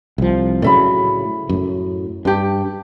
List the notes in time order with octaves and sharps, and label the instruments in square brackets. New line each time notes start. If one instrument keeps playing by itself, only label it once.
[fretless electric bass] C2 F3
[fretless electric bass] A2 C#3 F#3 [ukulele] D5 E5 B5
[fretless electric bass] F#2 A2
[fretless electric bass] G2 [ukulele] D4 G4